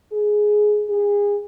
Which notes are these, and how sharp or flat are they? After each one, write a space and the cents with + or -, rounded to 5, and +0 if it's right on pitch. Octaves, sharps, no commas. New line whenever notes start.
G#4 +10
G#4 -25